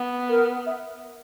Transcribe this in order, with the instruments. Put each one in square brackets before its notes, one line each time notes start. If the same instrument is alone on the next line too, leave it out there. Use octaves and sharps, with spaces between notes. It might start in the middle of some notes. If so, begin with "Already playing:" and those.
Already playing: [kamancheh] B3
[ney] A#4
E5